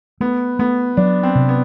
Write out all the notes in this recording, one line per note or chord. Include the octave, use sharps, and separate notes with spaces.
A3 B3
A3 B3
F#3 D4
C4
C3
B3